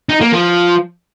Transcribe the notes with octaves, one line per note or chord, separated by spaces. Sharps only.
D#4
A#3
F3